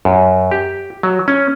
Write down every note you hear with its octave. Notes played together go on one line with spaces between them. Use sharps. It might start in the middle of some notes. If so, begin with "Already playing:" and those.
F#2
G4
F#3
C#4